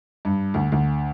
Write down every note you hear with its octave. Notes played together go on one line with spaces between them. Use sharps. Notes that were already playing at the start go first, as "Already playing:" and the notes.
G2
D2
D2